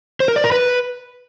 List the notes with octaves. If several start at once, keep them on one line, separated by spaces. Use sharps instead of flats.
C5
A#4
D5
A#4
B4